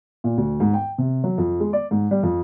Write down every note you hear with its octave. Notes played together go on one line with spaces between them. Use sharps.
A#2
D2
G#2
G5
C3
F#3
F2
G#3
D5
G#2
G3
F2